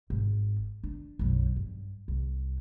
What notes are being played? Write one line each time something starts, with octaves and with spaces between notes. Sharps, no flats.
G#1
D4
B1 F#2
G2
C2